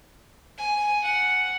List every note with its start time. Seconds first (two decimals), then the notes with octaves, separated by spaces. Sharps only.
0.58 G#5
1.04 F#5